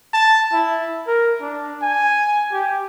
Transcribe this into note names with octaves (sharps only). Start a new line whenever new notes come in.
A5
E4
A#4
D4
G#5
G4